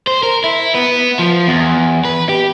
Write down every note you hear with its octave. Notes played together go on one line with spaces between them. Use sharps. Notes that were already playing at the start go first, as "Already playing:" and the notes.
C5
A#4
E4
B3
F3
E2
B4
G4